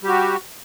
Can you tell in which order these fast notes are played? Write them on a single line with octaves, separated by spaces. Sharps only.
G3 G4 F#4